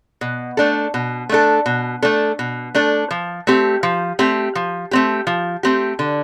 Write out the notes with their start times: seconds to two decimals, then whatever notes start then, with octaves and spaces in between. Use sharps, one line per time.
0.21 B2
0.57 A3 D4 A4
0.94 B2
1.29 A3 D4 A4
1.66 B2
2.02 A3 D4 A4
2.39 B2
2.75 A3 D4 A4
3.11 F3
3.47 A3 C4 G4
3.83 F3
4.19 A3 C4 G4
4.55 F3
4.91 A3 C4 G4
5.27 F3
5.63 A3 C4 G4
5.99 D3